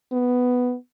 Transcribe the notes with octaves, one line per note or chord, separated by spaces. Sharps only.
B3